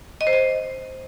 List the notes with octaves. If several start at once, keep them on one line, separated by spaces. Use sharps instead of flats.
D#5
C5
D#5